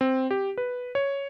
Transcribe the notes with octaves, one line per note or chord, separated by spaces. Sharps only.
C4
G4
B4
C#5